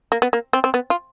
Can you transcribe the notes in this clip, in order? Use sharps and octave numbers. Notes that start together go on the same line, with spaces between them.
A#3
B3
A#3
C4
C4
B3
F4